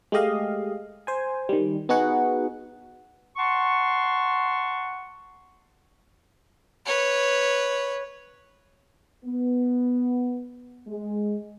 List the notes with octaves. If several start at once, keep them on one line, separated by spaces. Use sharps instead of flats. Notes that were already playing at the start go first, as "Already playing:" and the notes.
G#3 A3 G4 D#5 F5
C5 G#5
D#3 G3
B3 D#4 F#4 G#4 F#5
F#5 A5 C6 C#6
B4 C#5
B3
G#3